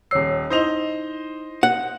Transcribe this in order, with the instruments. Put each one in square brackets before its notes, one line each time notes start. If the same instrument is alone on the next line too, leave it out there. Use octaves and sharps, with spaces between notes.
[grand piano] D#1 C7 [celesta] C#5 E6
[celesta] D#4 E4 [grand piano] C5 D#5 F7
[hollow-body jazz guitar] F#5